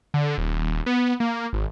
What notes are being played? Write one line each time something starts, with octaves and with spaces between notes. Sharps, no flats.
D3
D#1
B3
A#3
G#1